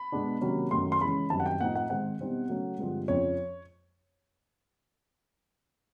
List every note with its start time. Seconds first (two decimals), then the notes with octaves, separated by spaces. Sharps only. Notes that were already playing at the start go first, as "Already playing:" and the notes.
Already playing: B5
0.12 B2 G#3 B3 D4
0.41 C3 D#3 F#3 A#3 C#4
0.71 F#2 D#3 F#3 A3 C#4 C6
0.92 C6
1.01 C#3 E3 G#3 C#4 B5
1.30 F#2 D#3 G3 C4 D#4 A5
1.40 F#5
1.46 G5
1.61 A2 F3 A3 C4 D#4 F#5
1.75 F#5
1.90 G#2 D#3 G#3 C4 F#5
2.19 B2 G3 C4 D#4
2.49 C#3 F#3 A3 C#4
2.79 G2 D3 F3 G#3 C4
3.08 F2 C#3 F3 C#5